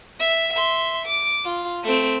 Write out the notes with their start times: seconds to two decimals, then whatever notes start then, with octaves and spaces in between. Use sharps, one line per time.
0.20 E5
0.53 E5 C6
1.06 D6
1.45 F4
1.84 A3 C4